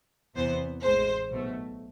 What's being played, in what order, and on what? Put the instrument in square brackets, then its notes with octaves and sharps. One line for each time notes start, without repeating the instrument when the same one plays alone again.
[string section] E2 C3 E3 B3 C5
A1 A2 G#3 C5
B1 B2 A3